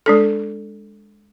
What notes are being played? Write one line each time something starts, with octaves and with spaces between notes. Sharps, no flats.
G#3 D4 A4